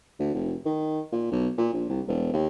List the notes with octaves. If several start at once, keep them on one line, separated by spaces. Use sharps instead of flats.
D2
F1
D#3
A#2
B1
A#2
A#1
C2
E1
D#2